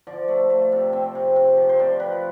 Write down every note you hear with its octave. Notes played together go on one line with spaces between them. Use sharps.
F3 D5
A3
A3
C3
C4
C3
C3
F3
C5
C3 D5
F3 B4